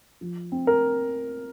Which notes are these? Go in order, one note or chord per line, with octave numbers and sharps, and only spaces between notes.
F3
C4
A#4